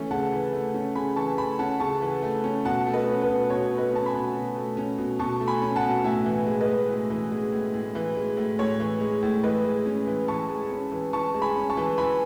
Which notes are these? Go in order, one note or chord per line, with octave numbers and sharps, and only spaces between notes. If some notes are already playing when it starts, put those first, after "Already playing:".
Already playing: E3 A3 C#4
C#3 F#5 A5
E3
A3
C#4
C#3 G#5 B5
E3 A5 C#6
A3 G#5 B5
C#4 F#5 A5
C#3 A5 C#6
E3
A3
C#4
B2 F#5 A5
A3
B4 D#5
C#4
B4
B2
B2 C#5
A3
B4 D#5
C#4 A5
G#5 B5
B2
B2
A3
C#4
B2
B2 A5 C#6
A3
G#5 B5
C#4
F#5 A5
B2
A2 E5 G#5
E3
G#3
B4 D#5
A2
A2
E3
G#3
A2
A2
E3
G#3
A2
A2 C#5
E3
G#3
A2
E3 B4 D#5
G#3
C#4
E3
E3 A5 C#6
G#3
C#4
E3
E3 A5 C#6
G#3
G#5 B5
C#4
A5 C#6
E3
E3 G#5 B5